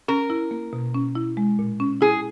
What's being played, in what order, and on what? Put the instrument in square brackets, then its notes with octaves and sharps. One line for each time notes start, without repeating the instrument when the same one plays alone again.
[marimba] C#4 [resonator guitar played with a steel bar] A#4
[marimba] E4
A#3
B2
C#4
E4
G#3
A#2
C#4
[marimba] E4 [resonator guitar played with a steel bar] G#4